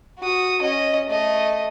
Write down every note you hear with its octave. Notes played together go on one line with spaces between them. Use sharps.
F#4 D#6
C#4 D#5
A3 D#5